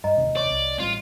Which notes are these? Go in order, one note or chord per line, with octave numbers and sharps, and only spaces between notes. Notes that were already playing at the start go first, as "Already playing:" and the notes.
G2 D#5 A#5
E1 D#2 C3
C#5 D5 C#6
C2
A1 G3 C4 F4